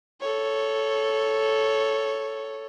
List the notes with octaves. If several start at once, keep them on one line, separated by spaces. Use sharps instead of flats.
A4 C#5